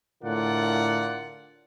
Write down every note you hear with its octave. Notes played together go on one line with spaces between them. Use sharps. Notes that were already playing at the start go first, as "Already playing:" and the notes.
A2 D3 F4 A#4 D5 F#5